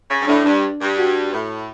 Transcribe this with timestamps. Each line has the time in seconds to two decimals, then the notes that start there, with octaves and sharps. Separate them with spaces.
0.10 C#3
0.21 G2
0.27 A2 D4
0.45 G2
0.80 G2
0.98 F#4
1.33 A2